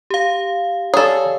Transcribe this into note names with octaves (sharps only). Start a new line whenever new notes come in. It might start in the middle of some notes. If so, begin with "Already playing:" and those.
G4 F5
G#4 A4 C#5 D5